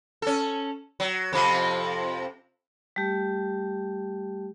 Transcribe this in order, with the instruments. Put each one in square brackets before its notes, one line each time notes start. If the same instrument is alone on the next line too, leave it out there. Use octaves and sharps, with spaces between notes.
[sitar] C#4 A4
F#3
F2 C3 F3
[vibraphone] G3 A3 G4